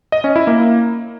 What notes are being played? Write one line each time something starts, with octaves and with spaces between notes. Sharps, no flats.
D#5
C#4
E4
A#3